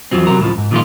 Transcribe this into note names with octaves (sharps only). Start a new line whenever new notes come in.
E2 F3 F#3 C4
C3 F#3 A#4
C#2 A2 E3 F3
G#2
A#2 D#3 F3 G3 G#3 F4